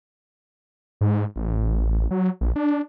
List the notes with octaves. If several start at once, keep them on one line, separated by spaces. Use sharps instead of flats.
G#2
A1
F#3
A#1
D4